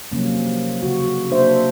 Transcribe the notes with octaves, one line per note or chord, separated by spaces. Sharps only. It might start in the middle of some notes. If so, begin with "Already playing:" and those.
C3 F3 F#3 A#3 C#4
C#3 F#3 F#4
C3 A#3 D4 C5 E5